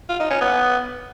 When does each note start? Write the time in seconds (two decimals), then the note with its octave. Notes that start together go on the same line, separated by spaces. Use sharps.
0.10 F4
0.20 D#4
0.30 C#4
0.41 B3